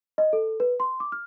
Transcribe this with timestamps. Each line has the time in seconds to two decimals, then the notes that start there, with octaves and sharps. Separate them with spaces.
0.18 D#5
0.33 A4
0.60 B4
0.80 C6
1.00 D6
1.12 F6